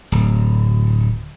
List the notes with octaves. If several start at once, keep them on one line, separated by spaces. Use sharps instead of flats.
D1